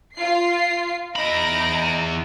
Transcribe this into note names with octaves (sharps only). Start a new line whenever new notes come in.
F4 C7
E2 D#4 B5 A#6 D7